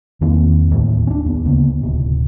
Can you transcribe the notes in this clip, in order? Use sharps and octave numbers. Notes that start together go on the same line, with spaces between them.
E2 D#3 A#3 C4
D1 D#2 A2
C#4 D4
D#2 B3
D2 C#3 A#3 B3
D1 C3